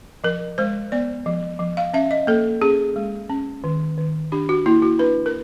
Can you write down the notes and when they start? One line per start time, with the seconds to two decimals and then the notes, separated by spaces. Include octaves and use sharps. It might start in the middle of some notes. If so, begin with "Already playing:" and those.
0.24 F3 A#4
0.58 G#3 C5
0.92 B3 D5
1.26 F3
1.59 F3
1.77 F5
1.94 C#4 E5
2.11 D#5
2.27 A#3 A4
2.61 C#4 G#4
2.96 G#3
3.29 C#4
3.64 D#3
3.98 D#3
4.32 D4 G4
4.49 F#4
4.66 A#3 E4
4.82 F#4
4.99 D4 B4
5.26 A#4